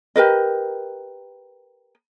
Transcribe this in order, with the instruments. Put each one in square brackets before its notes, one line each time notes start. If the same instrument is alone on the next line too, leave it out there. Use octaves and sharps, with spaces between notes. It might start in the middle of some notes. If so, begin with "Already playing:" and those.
[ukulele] G4 A#4 B4 D#5